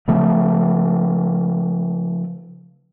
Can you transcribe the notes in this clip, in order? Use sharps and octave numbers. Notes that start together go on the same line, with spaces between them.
C#3 F3 A3